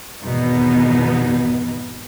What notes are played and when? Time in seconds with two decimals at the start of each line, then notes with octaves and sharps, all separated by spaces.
0.23 G#1 E2 B2 B3 D#4